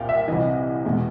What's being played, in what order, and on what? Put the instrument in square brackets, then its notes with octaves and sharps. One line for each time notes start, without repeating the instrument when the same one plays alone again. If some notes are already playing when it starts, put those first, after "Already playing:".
Already playing: [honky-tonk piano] C2 A#2 F5 G5
E5
C2 C3 E3 D#5
E2 B2 G#3